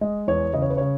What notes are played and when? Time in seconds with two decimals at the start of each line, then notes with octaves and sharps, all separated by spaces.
0.01 G#3 D#5
0.27 E2 C#5
0.53 C#3 D#5
0.62 C#5
0.70 B4
0.77 C#3 C#5